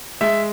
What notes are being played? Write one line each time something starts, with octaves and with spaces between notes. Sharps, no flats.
G#3 E5